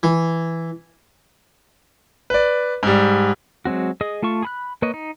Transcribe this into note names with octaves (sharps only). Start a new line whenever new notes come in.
E3
B4 D5
G#2 G3
F#3 G#3 C4 F#4
G#4 D#5 D#6
A3 F4 A5 C#6
G#4 B5 F#6
A#3 B4 C#5 D#5
D#4